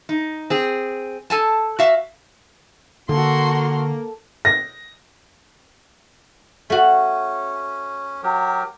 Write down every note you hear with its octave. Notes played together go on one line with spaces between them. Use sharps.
D#4
C4 G#4
A4 G#5 A5
F#4 E5 F5
D3 A#3 F#4 A4 C6
A#6
A3 C#4 F#4
F#3 G4 A#4